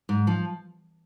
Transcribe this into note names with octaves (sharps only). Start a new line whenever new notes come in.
G#2
F3